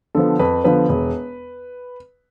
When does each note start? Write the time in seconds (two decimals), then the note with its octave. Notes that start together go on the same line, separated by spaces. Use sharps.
0.15 D3 F3 B3 A4
0.39 F2 B4
0.64 D3 F3 B3 B4
0.89 E1